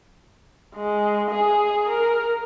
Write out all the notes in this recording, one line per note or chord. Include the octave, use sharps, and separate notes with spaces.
G#3
G#4
A#4